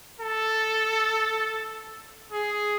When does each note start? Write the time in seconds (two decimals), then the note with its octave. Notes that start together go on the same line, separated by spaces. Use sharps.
0.20 A4
2.32 G#4